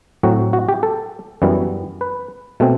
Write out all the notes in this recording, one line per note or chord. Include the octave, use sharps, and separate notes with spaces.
A2 F#3 C4 F#4
F#4
G4
A4
F#2 E3 G3 B3
B4
B2 A3 C4